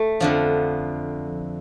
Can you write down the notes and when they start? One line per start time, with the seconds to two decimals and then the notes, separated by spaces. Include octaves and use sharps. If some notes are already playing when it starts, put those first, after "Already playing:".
Already playing: A3
0.20 F2 D3 F3